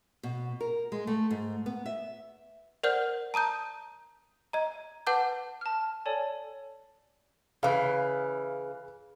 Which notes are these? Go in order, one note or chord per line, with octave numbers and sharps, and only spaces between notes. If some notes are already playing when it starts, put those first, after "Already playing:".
B2
A#4
G#3
A3
G#2
B3
E5
A#4 C5 D5 F#5 F6 G6
A5 A#5 D#6 G6
D#5 A#5
B4 F#5 A5 D6 G6
A5 F6
A4 C#5 D5 G#5 A5
C#3 E3 F5